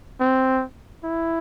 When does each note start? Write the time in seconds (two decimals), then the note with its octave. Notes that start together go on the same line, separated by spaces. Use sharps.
0.20 C4
1.04 E4